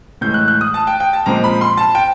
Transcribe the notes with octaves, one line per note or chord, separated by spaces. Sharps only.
A2 E3 G#3 G6
F#6
F#6
D#6
A5
G5
G5
A5
A#2 F3 G#3 C4 A#5
B5
C6
A5
G5